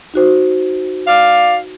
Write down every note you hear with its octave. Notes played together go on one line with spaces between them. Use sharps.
D#4 F#4 C5
D5 F5